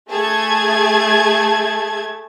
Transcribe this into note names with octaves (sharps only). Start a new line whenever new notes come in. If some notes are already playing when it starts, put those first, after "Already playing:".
A3 G#4 A5 G#6